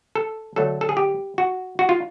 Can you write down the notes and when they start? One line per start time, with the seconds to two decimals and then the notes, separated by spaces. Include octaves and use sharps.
0.15 A4
0.56 D3 F#3 A3 A4
0.81 A4
0.89 G#4
0.97 G4
1.38 F#4
1.79 F#4
1.89 F4